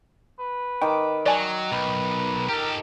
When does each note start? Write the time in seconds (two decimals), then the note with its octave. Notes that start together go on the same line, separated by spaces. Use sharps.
0.39 B4
0.82 D#3 G5 D6
1.26 F#3 D5 G#5 A5
1.72 B1 B4
2.49 G4 A4 A#4